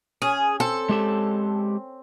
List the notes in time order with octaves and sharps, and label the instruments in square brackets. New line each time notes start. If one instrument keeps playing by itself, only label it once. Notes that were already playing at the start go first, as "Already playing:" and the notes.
[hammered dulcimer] C#4 [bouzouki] G#4
[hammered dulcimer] C4 [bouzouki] A4
[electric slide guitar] G#3 G4 A5